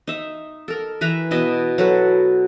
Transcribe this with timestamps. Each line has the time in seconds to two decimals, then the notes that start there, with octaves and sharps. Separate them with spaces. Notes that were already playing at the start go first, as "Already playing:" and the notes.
0.07 D#4 E5
0.68 A4 A#4
1.01 E3 B4 E5 A#5
1.31 B2 E4 D#5 E5
1.78 F#3 A4 B4